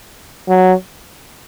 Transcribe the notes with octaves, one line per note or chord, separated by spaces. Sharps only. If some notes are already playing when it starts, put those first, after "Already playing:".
F#3